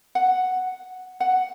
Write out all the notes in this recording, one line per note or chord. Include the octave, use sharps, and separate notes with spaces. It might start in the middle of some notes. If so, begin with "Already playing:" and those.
F#5
F#5